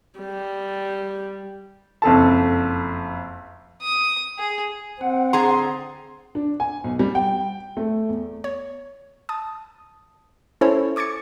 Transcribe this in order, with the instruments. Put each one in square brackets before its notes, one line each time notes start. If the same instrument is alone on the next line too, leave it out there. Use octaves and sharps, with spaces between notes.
[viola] G3
[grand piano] F#1 F2 A4 A5
[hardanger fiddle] D#6
G#4
[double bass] C4 [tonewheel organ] F#5
[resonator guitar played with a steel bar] D3 G#4 A#5 [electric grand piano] C6
[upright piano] D4
G#5
B1
G3
G5
A3
E2
[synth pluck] C#5
A5 D#6
C#4 E4 A4 C5 C#5
C#6 D6 G#6 A6 C#7